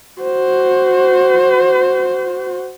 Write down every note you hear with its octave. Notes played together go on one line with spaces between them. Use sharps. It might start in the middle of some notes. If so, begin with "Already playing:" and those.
F#4 C5